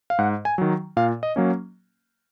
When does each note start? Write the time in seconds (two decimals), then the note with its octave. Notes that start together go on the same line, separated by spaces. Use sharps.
0.10 F5
0.19 G#2 F#5
0.45 G#5
0.58 D#3 F#3
0.97 A#2 F5
1.23 D#5
1.36 F#3 A#3 C#4